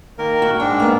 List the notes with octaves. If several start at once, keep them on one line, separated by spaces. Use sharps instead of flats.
D#3 A#3 A#4
F#4
G#2 D4 G5
A#3 B3